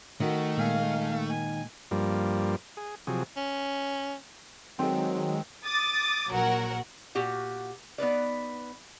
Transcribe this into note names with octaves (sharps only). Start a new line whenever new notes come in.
D#3 A3 F#4
A#2 G#3 A#3 F5 G#5
G#5
G2 F3 G3 A#3
G#4
C3 F3 F#3 G#4
C#4
D#3 F#3 G#3 C4
D6 D#6 A6
A#1 F#3 F#4 A#4 F#5
A#2 F#4 G4 F#5
B3 D#4 B4 D5